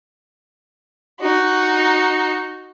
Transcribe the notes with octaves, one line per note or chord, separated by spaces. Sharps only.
D#4 F#4